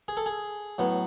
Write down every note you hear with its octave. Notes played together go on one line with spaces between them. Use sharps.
G#4
A4
G#4
A2 F#3 B3